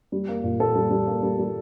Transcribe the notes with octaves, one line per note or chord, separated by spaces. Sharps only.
G3
A#3
A#2
A#2 A4
G3
G3
A#3
G3
G3